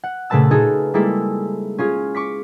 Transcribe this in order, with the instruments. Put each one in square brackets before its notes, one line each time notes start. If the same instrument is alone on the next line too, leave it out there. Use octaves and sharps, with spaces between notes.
[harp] F#5
A#2 C#3 A3 B4 A5 E6
D#4 F4 F#4 G#4 A4
G3 G#3 A#3 E4 A4
C#4 F4 G#4
C#6 D6 B6